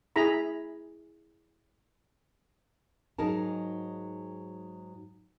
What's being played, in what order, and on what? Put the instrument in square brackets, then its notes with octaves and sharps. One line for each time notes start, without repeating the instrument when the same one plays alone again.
[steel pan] E4 G#4 A#5 B5
[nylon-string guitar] G#2 F#3 D#4 G#4 A#4 A5